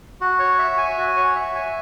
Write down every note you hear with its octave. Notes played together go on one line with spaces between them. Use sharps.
F#4
C#5
E5
G#5
F#4
C#5
E5
G#5